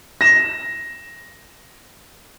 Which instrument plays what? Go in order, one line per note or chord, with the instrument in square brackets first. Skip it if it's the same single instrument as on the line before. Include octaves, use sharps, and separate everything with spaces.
[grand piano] A#6 E7